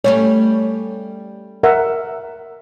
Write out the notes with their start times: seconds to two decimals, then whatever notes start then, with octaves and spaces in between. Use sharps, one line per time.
0.04 G3 A3 C#4 C#5
1.63 A#4 E5 F#5